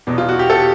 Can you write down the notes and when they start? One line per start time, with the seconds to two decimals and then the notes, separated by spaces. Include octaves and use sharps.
0.07 E2 B2
0.18 F4
0.29 F#4
0.39 G4
0.50 A4